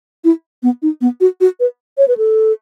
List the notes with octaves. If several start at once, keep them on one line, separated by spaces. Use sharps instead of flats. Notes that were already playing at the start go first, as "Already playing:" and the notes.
E4
B3
D#4
B3
F#4
F#4
B4
C#5
B4
A4